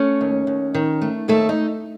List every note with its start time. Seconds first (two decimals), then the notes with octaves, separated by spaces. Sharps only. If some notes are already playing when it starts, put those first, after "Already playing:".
Already playing: A3 C#4 C#5
0.21 D#2
0.47 D#2
0.74 D#3
1.01 A3
1.28 D#2 A3 A4
1.49 D#4